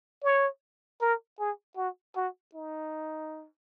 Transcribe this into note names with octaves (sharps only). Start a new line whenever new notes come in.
C#5
A#4
G#4
F#4
F#4
D#4